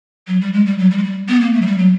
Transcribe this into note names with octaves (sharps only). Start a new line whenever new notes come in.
F#3
G3
G#3
G3
F#3
G3
G#3
G3
B3
A#3
A3
F#3
G3
F#3